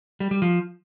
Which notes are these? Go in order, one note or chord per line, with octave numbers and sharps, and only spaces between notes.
G3
G3
F3